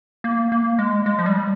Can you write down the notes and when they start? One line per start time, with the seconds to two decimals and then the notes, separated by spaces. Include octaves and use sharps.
0.24 A#3
0.52 A#3
0.79 G#3
1.06 G#3
1.19 F3
1.26 G3